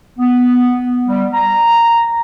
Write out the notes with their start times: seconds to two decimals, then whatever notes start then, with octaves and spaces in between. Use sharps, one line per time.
0.19 B3
1.08 G3
1.34 A#5